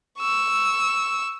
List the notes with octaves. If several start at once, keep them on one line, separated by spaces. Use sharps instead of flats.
C#6 E6